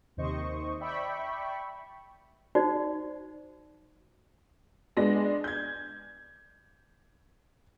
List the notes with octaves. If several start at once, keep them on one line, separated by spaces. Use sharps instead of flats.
D#2 C3 D#3 C5 D#5 C#6
D5 E5 G5 B5 C#6
D#4 F#4 C5 D5
G#3 B3 D4 A#6
G6 G#6